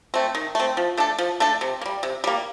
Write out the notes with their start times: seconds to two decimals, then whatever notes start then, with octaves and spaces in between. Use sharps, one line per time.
0.14 A3 C4
0.35 D#3
0.55 A3 C4
0.77 F3
0.97 A3 D4 A4
1.19 F3
1.40 A3 D4 A4
1.61 C3
1.81 A#3
1.86 G3
2.03 C3
2.24 G3 A#3